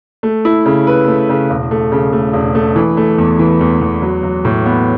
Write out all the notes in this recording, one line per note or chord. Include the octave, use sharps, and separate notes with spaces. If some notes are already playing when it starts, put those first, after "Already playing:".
A3
E4
C#3
B4
A3
C#3
E1
A3
C#3
A3
E1
A3
E3
A3
E2
E3
E2
E2
F#3
F#3
A2
B3